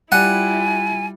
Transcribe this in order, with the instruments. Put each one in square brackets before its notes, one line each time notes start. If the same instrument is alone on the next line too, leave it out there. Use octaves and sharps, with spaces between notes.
[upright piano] G3 [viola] E4 F4 [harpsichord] F#5 [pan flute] G#5